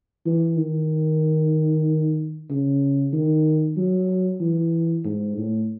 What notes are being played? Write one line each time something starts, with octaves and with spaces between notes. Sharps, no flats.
E3
D#3
C#3
D#3
F#3
E3
G#2
A2